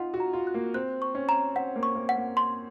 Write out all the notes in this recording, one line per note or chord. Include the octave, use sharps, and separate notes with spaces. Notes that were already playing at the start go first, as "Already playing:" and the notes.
Already playing: D#4 F4 F#5
F#4
A#5
F4
F#6
A#3
C4 F#6
C#6
C#4
A#5
C4 F#5
A#3
C#6
A#3
F#5
A#3
C6